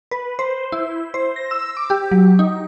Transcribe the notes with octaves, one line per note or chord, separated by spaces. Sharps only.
B4
C5
E4
C5
A#6
E6
D6
G4
F#3
D#4